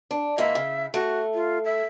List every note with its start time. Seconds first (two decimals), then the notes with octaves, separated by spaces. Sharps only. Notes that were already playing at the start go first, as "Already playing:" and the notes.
0.11 D4
0.38 G#2 E3 A#3 E5
0.55 C#3
0.94 A3 F#4
1.34 F4
1.65 E5